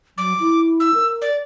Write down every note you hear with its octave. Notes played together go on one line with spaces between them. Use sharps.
F#3 D6
E4
E6
A#4
D5